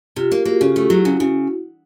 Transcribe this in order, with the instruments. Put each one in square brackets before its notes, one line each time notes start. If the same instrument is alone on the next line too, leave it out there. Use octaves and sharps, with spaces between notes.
[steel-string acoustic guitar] C3 [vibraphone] F4 G4
[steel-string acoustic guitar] A#3 [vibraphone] F4 G4
[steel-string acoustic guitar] A#3 [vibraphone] F#4 G#4
[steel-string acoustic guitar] C#3 [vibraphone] G4 A4
[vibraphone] F4 G4
[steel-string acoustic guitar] A3
[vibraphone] F4 G4
[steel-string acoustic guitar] F#3 [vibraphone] E4 F#4
[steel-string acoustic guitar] C#3
C#3